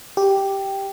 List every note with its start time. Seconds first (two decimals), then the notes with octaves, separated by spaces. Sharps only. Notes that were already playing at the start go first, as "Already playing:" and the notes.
0.17 G4